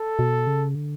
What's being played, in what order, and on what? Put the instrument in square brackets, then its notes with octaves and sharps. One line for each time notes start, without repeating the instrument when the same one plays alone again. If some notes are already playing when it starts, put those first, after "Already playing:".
Already playing: [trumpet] A4
[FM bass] B2
C#3
D3